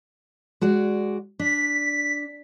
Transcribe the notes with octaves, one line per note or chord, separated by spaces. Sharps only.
G#3 F#4 D5
D4 B6